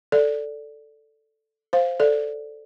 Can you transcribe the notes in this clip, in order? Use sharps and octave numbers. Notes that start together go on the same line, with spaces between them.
A4 D5
C5 F5
A4 D5